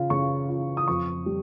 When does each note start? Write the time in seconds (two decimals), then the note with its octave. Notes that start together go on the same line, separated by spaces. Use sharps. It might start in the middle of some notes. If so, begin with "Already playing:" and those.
Already playing: C#3 F4
0.10 C#3 C#6
0.49 F4
0.77 D#6
0.88 F2 C#6
1.26 G3